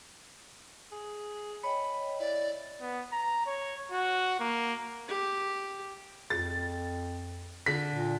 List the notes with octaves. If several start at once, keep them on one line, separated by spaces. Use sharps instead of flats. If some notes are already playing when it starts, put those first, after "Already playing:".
G#4
C#5 D#5 G5 B5
E4 D5
B3
A#5
C#5
F#4
A#3
G4
F2 A6
D3 B6
A#2